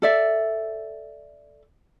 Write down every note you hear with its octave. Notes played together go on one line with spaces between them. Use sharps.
A4 D5 E5